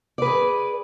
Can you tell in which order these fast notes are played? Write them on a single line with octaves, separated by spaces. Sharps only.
D5 B4 G#4